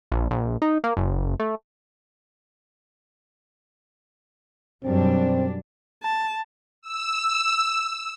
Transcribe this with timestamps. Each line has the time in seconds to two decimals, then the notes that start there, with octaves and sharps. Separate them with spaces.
0.12 A#1
0.31 A#1
0.62 D#4
0.84 A#3
0.97 F#1
1.40 A3
4.84 F#2 B2 F#3 G3 C4 D4
6.03 A5
6.82 E6